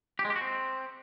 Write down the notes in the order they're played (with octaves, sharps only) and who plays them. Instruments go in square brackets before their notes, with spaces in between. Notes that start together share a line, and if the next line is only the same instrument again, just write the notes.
[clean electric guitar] G4
G#3
G4
F#4
C4